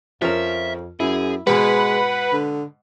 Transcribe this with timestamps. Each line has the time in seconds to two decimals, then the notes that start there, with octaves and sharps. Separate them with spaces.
0.22 F2 F3 C#4 A#4 E5
1.00 F#2 E4 G#4
1.47 G#2 B2 G#3 B4 F#5
2.32 D3